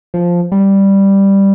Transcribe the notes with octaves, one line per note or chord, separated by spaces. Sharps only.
F3
G3